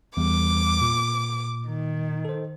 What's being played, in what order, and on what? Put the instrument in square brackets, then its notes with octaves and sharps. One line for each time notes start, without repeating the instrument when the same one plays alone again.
[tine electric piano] E2 G3 [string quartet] D6
[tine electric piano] A#2
[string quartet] D#3
[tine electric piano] A4 C5